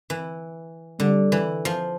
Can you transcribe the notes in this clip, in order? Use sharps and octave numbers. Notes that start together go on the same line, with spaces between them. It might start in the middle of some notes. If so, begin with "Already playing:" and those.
E3
D3 G3
E3
F3